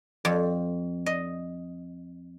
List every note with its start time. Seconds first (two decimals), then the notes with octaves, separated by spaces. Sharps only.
0.25 F2
1.06 D#5